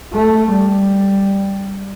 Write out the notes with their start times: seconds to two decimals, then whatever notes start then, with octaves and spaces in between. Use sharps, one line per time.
0.14 A3
0.52 G3